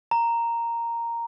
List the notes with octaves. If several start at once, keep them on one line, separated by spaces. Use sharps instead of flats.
A#5